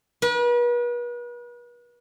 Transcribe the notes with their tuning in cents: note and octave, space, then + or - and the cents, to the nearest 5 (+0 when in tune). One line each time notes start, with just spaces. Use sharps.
B4 -40